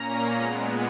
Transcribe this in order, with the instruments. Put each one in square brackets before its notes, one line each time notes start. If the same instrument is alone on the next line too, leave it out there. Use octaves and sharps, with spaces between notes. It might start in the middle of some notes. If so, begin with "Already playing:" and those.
Already playing: [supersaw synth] A#2 A#3 C#4 A#5
A#2 G#3 B3